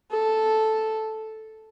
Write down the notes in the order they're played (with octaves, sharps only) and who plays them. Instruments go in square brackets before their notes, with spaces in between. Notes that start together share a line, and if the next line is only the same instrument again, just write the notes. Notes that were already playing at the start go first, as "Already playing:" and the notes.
[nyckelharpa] A4